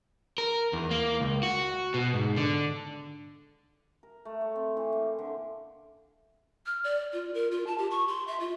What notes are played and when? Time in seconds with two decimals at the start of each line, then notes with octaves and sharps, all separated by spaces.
0.38 A#4
0.73 E2
0.91 A#3
1.20 C#2
1.43 F#4
1.94 B2
2.14 G#2
2.36 D3
4.03 A#4
4.25 A3
4.41 C#5
4.56 C4
4.77 E3
4.92 A#3
5.19 D3
6.67 F6
6.84 D5
7.13 F4
7.34 A#4
7.51 F4
7.67 A5
7.78 G4
7.91 C#6
8.08 C6
8.27 E5
8.40 F4